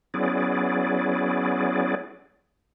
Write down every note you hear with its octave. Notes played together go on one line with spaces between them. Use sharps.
F#3 B3 C#4 E4 G#4 D5